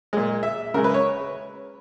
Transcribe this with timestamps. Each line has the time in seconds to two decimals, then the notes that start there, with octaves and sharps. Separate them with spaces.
0.13 A#2 G#3
0.43 E5
0.74 C#3 G#3 A#4
0.84 B4
0.94 C#5